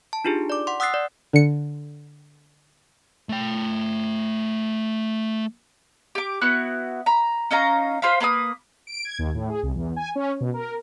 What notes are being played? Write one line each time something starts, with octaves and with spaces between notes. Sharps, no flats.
A5
D4 D#4 F4 G4 G#4
D5 D6
F#5 C6
F#5 D#6 E6 F#6 A6 C7
D5
D3 C#7
A3 G5
G4 D6
B3 E4 F#4 F#6
A#5 B5
C#4 D#4 F5 A#5
F4 C5 F5 B5
A#3 B4 G#5 D#6
D7
G#6
D#2
A2
G#4
C2
E2
G#5
C#4
B2
A#4